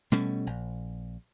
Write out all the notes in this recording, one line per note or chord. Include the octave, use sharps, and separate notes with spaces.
B2 G3 A3 C#4
A#1